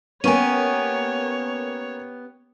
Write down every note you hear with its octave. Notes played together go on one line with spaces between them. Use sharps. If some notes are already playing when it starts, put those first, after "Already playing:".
A#3 B3 C#4 G4 C#5 G#5 C#6 D#7